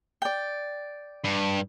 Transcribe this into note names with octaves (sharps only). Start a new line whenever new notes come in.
D5 G5
G2